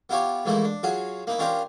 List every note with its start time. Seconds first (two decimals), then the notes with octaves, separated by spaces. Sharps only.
0.09 B3 E4 F4 G4 C#5
0.45 G#2 E3 F3 A3 A#3 E4
0.64 D4
0.83 F#3 F4 F#4 G#4
1.27 A#3 D#4 E4
1.39 C#4 D4 F4 G4 A#4 C5